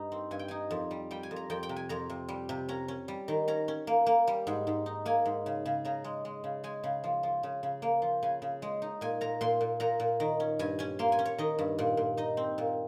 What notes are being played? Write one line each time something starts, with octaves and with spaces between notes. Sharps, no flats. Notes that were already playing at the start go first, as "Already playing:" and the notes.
Already playing: G2 D#4
C4
G2 G#5
G5
D#4 G#5
F2
G3
G3 G5
G#5
F2
A#5
F2 G5
G5
C3
G#5
F2 A#5
C3
G3
C3
C#4 A#5
C#4
G3
D#3
C#4 A#5
C#4
A#3
A#3
G3
G#2
G#2
D#4
A#3 G#5
G#2
C#3
C#3
C#3 A#5
G#3
G#3
C#3
G#3 G#5
C#3
F3
F3
C#3
C#3
A#3
F3
C#3 G#5
C#3
G#3
D#4
A#2 G#5
A#2 A#5
A#2 C6
A#2
A#2 A#5
A#2
D#3
C#4
G2 G#5
C#4 G#5
A#3 C6
G#5
C#4
C#5
D#3 D#5
G2
A#2
A#2
D#4 D#5
C4
A#2